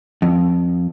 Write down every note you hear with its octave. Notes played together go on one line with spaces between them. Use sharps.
F2